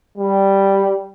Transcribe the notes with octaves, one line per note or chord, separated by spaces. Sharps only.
G3